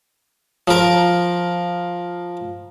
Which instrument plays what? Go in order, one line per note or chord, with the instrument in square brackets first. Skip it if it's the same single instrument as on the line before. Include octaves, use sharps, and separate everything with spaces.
[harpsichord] F3 A#4